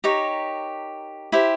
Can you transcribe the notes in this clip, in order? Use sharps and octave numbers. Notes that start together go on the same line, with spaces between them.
D#4 G4 A#4 C#5
E4 G4 C5